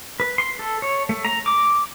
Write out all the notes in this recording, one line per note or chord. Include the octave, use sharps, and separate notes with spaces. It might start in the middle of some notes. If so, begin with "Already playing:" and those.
B4
C6
A4
C#5
A3
A#5
D6